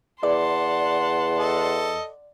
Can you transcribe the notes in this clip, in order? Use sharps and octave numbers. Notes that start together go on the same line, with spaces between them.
E2 D5 F#5 A5 C6
A4 D#5